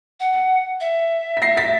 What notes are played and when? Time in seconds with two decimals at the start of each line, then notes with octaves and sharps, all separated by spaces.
0.20 F#5
0.81 E5
1.37 B6
1.42 A#6 C7
1.57 A6 B6